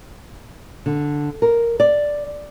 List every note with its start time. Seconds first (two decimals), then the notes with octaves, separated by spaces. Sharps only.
0.86 D3
1.42 A#4
1.80 D5